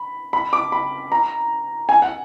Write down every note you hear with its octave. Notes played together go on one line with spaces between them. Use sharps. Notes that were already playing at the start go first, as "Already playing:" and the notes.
Already playing: B5
B5
D6
B5
A#5
G#5
F#5